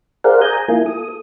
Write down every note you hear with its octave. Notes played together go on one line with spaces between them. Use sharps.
G#4 A#4 C5 D5 F5 F#5
G#5 A#5 D#6 G6
A#3 E4 F4 G#5
A4 D#6